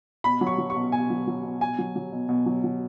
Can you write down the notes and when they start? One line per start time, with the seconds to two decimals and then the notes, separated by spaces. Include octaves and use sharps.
0.24 B2 B5
0.41 F#3
0.47 C#6
0.58 F#3
0.70 C#6
0.76 B2
0.92 B2 G#5
1.10 F#3
1.27 F#3
1.44 B2
1.61 B2 G#5
1.78 F#3
1.96 F#3
2.12 B2
2.29 B2
2.46 F#3
2.64 F#3